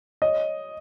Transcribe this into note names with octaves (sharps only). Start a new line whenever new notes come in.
C#5 D#5